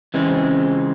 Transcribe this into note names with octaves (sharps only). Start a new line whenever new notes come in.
C#3 E3 G#3 C4